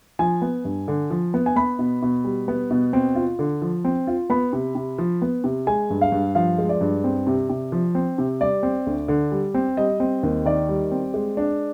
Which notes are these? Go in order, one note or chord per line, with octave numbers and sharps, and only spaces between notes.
F3 G#5
B3
G2
D3
F3
B3
G#5
B3 B5
B2
B2
G3
B3
B2
C4
F4
D3
F3
C4
F4
B3 B5
C3
C3
F3
B3
C3
G#3 G#5
G2
F5
G2
F3 F5
G#3
D5
G2
C4
C3
C3
F3
C4
C3
G3 D5
C4
D2
D3
G3
C4
G3 D#5
C4
D#2
D#3 D5
G3
C4
G#3
D4